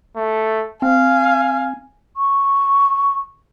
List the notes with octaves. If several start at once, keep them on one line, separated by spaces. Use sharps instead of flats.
A3
C4 F5 G#5
C#6